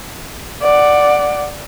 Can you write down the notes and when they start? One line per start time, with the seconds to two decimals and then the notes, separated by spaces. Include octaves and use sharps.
0.62 D5 F#5